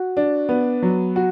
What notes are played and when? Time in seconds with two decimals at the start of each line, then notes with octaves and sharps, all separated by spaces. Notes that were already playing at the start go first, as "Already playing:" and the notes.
Already playing: F#4
0.17 D4
0.49 B3
0.82 F#3
1.16 F#4